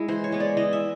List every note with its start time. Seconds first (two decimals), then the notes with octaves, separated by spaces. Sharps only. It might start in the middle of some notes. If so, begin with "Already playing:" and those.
Already playing: G#3 E4
0.08 E3 C5
0.24 C#5
0.32 G#3 B3
0.40 D5
0.57 E3 D#5
0.73 E5